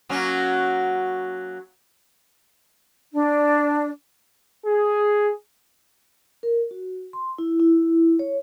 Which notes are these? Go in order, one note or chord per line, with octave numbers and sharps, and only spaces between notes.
F#3 A#3 C#4
D4
G#4
A#4
F#4
C6
E4
E4
C#5